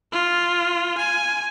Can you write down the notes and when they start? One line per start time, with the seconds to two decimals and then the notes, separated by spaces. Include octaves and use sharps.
0.12 F4
0.98 G#5